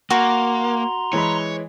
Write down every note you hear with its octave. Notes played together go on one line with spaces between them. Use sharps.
A#3 F#4 A#5 C6
E3 G#3 C#5 B5